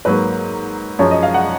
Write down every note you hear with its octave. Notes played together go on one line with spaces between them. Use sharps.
G#2 F#3 A#3 B4
F#2 F3 G#3 C#5
D#5
F5
F#5